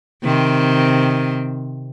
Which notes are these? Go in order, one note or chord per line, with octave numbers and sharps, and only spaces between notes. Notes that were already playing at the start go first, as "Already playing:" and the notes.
C3 D#3 C4